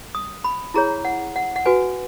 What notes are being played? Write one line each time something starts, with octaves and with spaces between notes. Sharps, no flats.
D#6
B5
E4 G#4 C#5 A#5
F#5
F#5
F#5
F#4 B4 G#5